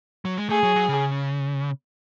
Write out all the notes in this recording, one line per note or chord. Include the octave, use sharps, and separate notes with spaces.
F#3
G#3
A3 G#4
F#3
F#3
C#3